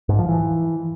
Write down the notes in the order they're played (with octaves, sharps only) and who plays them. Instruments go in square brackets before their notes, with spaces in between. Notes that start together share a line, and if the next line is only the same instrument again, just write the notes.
[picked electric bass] G#2
F3
E3